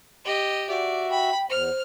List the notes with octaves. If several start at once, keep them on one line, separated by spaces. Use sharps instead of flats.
G4 D#5
F#4 D5 E5
G5 B5
E2 C5 F6